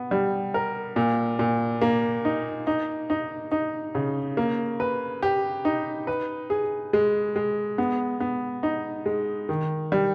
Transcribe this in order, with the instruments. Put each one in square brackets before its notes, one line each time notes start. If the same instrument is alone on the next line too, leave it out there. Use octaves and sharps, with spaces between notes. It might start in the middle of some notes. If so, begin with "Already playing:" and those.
Already playing: [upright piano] B3
G3
A#4
A#2
A#2
A#3
D#4
D#4
D#4
D#4
C#3
A#3
B4
G4
D#4
B4
G#4
G#3
G#3
B3
B3
D#4
G#3
D#3
G3